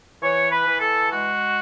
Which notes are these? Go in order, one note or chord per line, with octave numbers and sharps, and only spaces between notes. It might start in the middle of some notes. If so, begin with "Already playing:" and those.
E3 C#5
B4
E3
A4
G#3 F#4